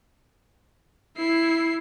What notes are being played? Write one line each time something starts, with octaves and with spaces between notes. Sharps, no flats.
E4 C7